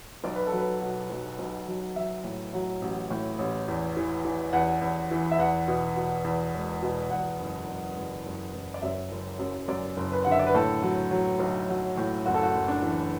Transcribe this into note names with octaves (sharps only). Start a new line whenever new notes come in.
B1 D5
B4
A4
F#3
B4
B2
B1
B1
F#3
F#3 E5
A2
F#3
A1
A2
A1
E2
E3
E3
E2 F#5
E2
E3
E5
E2 F#5
B2
B2
E2
E1
B2
E2 F#5
F#1
F#1
F#1
F#1
F#1
D5
F#2 E5
F#1
F#2
F#2 D5
F#1
B4
D3 F#5
E5
D5
B4
A2 A4
F#3
F#3
B1
F#3
A2
F#1 F#4
A4
F#4
F#1
D4
E3